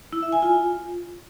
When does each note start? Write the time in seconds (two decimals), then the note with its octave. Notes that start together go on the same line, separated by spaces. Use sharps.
0.13 E4
0.23 E5
0.32 G#5
0.42 F4